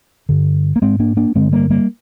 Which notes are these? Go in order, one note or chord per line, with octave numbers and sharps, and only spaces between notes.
G2 D3
A#3
G#2 G#3 C4
A#3 D4
A#3 D4
G2 D3 G#3 C4
G3 A#3
G3 A#3